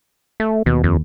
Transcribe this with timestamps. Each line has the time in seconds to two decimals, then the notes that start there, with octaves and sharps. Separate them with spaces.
0.40 A3
0.66 D#2 B2
0.84 F2